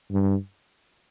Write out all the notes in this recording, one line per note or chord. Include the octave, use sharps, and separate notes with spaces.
G2